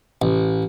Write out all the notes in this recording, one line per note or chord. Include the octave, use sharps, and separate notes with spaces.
A1